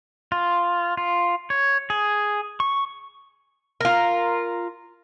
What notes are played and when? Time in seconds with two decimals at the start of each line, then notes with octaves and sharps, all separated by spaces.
0.32 F4
0.97 F4
1.50 C#5
1.90 G#4
2.60 C#6
3.81 F4 A#4